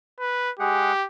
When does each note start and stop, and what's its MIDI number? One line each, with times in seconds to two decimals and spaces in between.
0.20 0.51 71
0.60 0.92 56
0.60 1.06 67
0.60 0.92 68
0.60 0.92 78